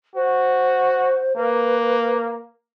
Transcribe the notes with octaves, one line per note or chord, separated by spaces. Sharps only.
F#4 C5
A#3 B4